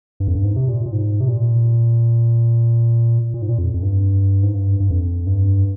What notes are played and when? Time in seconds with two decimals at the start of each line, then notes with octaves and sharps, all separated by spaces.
0.20 G2
0.28 F2
0.35 G2
0.44 G#2
0.56 C3
0.68 A#2
0.86 A#2
0.92 G#2
1.21 C3
1.28 A#2
3.34 A#2
3.42 G#2
3.49 A#2
3.58 F2
3.74 F2
3.82 G2
4.43 G#2
4.54 G2
4.80 G2
4.91 F2
5.27 G2